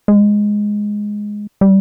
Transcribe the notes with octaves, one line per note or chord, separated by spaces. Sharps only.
G#3
G3